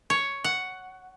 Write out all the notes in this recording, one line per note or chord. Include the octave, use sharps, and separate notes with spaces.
C#5
F#5